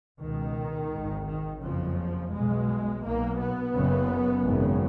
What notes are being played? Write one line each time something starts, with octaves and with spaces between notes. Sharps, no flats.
C#2 B2 D#3
G#1 G#2
D#3
F#1 F2 C#3 F3
B1 B2 G#3
B1 B2 A#3
B3
F#1 F#2 C#3
G#1 F#2 C#3